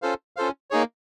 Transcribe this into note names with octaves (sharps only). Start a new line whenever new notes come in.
C#4 F4 A4 C5 F5
C#4 F4 A4 C5 F5
A#3 D#4 G#4 C#5